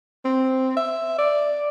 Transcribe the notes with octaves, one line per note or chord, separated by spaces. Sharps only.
C4
E5
D5